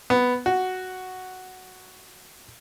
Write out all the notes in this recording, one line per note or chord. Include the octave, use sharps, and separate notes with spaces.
B3
F#4